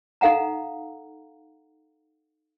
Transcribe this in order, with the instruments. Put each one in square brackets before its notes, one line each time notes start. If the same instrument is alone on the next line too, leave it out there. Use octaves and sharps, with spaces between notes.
[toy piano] D#4 A4 F5 F#5 A#5